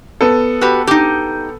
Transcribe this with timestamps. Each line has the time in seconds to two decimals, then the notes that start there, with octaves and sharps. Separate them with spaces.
0.21 B3 A4
0.61 F#4 G4 B4
0.87 D#4 G4